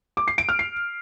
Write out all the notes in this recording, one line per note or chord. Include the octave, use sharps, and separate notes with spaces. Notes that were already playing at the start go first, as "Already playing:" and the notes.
D6
C7
D7
F6
C7